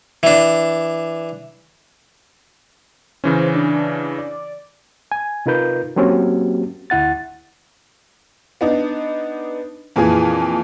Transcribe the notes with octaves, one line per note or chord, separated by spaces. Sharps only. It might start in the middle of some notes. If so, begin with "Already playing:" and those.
E3 D4
C#3 E3 C#4 C5
D4
D5
G#5
C3 D#4 F4 A#4 B4 G6
F#3 A#3 C4 C#4 F#4 G4
D2 E4 F#5 A6
B3 D4 D#4
F2 A#2 E3 G#4 G#5